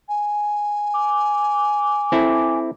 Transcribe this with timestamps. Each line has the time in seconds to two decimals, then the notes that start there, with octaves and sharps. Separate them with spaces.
0.09 G#5
0.94 D6
2.12 C4 E4 A4